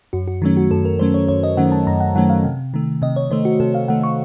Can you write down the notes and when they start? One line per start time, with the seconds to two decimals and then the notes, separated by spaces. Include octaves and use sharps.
0.13 F#2 F#4
0.28 F#4
0.42 D#3 F#3 A3 C#4
0.57 F#4
0.70 F#2 A4
0.85 A#4
0.99 D#3 F#3 A3 C#4 C5
1.14 C#5
1.29 F#2 C#5
1.43 D#5
1.57 D#3 F#3 A3 C#4 F#5
1.72 A5
1.87 F#2 A#5
2.00 F#5
2.15 D#3 F#3 A3 C#4 F#5
2.30 F5
2.44 C3
2.74 D#3 A3
3.02 C3 D#5
3.16 C#5
3.31 D#3 A3 C5
3.45 F#4
3.60 C3 A4
3.75 F5
3.88 D#3 A3 F#5
4.03 C#6